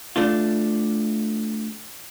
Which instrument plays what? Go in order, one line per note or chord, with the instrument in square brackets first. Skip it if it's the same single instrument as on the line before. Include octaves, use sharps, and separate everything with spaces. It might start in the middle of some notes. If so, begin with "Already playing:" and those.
[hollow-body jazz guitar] A3 D4 F4